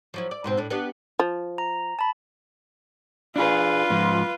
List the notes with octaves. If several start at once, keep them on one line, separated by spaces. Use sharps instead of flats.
F3 F#3 E4
D5
G#2 B2 C4
A2 D4
B3 D4 G4
F3
A#5
A5 B5
D4 F4 G#4 B4
G#2 F3